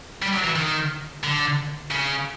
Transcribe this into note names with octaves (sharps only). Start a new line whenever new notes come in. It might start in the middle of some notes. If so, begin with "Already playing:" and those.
G3
F#3
E3
D#3
D3
C#3